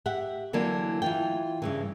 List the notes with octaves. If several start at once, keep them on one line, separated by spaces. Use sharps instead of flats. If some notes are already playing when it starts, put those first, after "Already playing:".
G4 E5 F#5
D3 E3 F#3 A#3 D4
E3 F4 G5
G2 C#3 E3